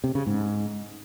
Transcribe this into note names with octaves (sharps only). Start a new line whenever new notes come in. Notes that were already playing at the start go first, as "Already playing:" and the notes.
C3
C#3
G#2